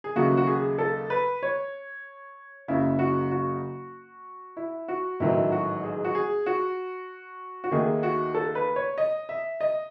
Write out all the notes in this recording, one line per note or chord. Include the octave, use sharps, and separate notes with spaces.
G#4
D#2 C#3 F#3 A3 F#4
F#4
G#4
A4
B4
C#5
F#1 F#2 C#3 E4
F#4
F#4
E4
F#4
A1 G#2 D#3 F#3 A3 E4
F#4
G#4
F#4
G#4
F#4
F#4
D#2 D#3 A3 G#4
F#4
A4
B4
C#5
D#5
E5
D#5